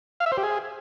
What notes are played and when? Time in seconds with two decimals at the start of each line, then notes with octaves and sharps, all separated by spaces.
0.20 F5
0.26 E5
0.32 C5
0.38 G4
0.43 G#4